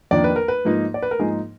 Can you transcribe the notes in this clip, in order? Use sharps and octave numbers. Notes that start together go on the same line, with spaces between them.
F2 D#3 A#3 D4 D5
B4
A#4
B4
G#2 F3 A#3 D#4
D5
B4
A#4
G#2 F3 A#3 D#4 G#4